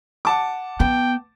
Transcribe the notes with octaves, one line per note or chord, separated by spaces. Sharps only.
F#5 A5 D6
B3 G5